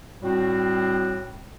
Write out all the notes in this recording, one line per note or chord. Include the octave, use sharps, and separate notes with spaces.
A2 G3 C4 F#4